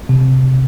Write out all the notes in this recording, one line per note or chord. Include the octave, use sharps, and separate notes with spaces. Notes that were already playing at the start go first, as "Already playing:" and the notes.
C3